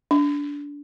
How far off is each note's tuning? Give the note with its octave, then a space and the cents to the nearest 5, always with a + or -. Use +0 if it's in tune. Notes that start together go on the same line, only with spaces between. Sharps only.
D4 -25